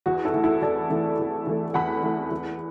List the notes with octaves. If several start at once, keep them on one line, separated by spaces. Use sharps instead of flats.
E2 F#4
E4 A4
E3 A3
E4 A4
E2 A4 D5
E3 A3
E2
E3 A3
E2 F#5 B5
E3 A3
E2